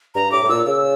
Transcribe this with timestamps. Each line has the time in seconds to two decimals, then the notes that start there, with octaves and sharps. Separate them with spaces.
0.15 G2 A#5
0.32 A2 D6
0.43 A2
0.49 A#2 E6
0.66 C#3 E6